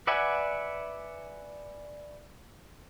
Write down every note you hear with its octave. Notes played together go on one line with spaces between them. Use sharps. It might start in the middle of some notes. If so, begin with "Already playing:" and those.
B4 D5 E5 F#5 G#5